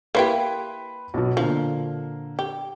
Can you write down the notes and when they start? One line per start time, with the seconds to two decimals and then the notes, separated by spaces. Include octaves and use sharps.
0.15 A#3 E4 G4 B4 C6
1.14 B1 B2
1.37 A#2 D3 F3 A#3
2.39 G4